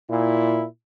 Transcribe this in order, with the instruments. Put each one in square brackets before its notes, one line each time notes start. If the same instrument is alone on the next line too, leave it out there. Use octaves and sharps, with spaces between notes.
[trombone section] A#2 E4